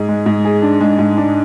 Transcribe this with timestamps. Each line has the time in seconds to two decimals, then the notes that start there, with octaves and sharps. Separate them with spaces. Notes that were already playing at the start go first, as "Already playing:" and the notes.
Already playing: G#2 G#4
0.09 G#3
0.26 G#2
0.45 G#4
0.62 D4
0.81 G#3
0.99 G#2
1.17 D4